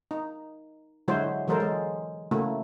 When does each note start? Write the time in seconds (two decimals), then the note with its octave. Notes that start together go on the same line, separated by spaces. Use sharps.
0.11 D#4
1.08 D3 F#3 G#3 E4 F#4 C5
1.48 E3 F#3 G#3 A4 A#4 C5
1.60 G#3
2.31 C#3 A3 A#3 E4 F#4